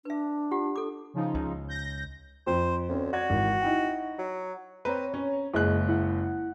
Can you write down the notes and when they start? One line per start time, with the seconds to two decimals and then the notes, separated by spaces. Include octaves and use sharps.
0.05 D4 B4 E5
0.51 F4 G4 F#5
0.76 A4 D6
1.14 C#3 F3 D#4
1.35 C#2
1.68 G6 A#6
2.47 F2 C5
2.89 D2 C4 C#4
3.13 F#4 D5 G#6
3.30 G#1 E3
3.62 D#4 E4 G5
4.19 F#3
4.85 C4 B4 C#5 A#5
5.14 C#4
5.54 F#1 G#3 E4 G#4 F#6
5.88 E4 F#5